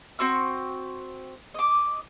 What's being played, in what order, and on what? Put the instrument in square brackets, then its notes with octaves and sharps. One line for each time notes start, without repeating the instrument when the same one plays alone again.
[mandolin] C4 F#4 C#6 E6
D#5 D6